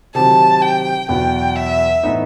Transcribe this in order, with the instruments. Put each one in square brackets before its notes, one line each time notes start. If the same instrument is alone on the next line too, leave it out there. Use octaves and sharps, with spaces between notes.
[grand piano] C3 D#3 F#3 [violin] A5
[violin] G5
[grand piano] E2 B2 F#3 B3 E4 [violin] G5
[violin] E5
[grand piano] A2 E3 B3 D#4